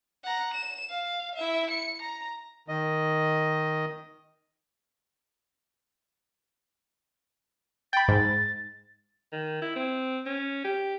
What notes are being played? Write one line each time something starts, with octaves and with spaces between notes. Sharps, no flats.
F#5 A#5
E7
F5
E4 E5
C#7
A#5
D#3 D#5
G5 B5 A6
G#2
D#3
E4
C4
C#4
G4